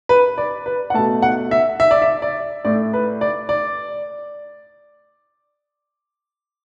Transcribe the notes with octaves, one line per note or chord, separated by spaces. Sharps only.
B4
D5
B4
F#5
B2 A3 A5
F#5
E5
E5
D5
E5
D5
A2 A3 D5
B4
D5
D5